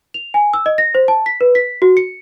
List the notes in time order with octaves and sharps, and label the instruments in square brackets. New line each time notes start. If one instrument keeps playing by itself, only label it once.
[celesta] F7
G#5
E6
D#5
A#6
C5
A5
B6
B4
B6
F#4
C#7